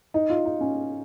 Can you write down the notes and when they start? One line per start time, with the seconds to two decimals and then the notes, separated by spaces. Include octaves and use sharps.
0.14 D#4
0.30 F4
0.45 D#4
0.61 C#4